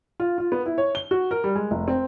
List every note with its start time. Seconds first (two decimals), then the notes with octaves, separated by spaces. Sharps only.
0.20 F4
0.38 F4
0.52 B3
0.66 E4
0.78 C#5
0.95 G7
1.11 F#4
1.31 A#4
1.44 G3
1.55 G#3
1.71 F1
1.88 C4